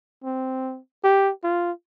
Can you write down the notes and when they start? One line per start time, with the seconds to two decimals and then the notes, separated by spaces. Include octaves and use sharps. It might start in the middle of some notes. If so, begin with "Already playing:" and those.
0.24 C4
1.04 G4
1.44 F4